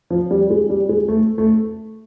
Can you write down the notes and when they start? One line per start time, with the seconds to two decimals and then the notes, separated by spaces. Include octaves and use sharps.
0.10 F3
0.31 G3
0.50 G#3
0.70 G3
0.89 G#3
1.08 A3
1.38 A3